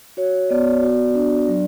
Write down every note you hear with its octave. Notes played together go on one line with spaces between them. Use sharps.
F#4 C#5
B3 D5
F#4
D4
F#3